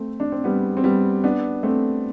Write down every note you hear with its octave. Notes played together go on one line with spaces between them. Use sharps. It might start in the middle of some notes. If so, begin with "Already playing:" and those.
Already playing: A3 C4
D4
C4
G3 B3
C4
G3 B3
B3 D4
A3 C4